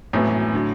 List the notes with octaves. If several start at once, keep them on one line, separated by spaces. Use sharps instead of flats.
G#1 F#2 A2 E3 B3
D3 F#3